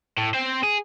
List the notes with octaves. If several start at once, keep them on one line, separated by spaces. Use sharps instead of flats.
A2
C4 C5
G#4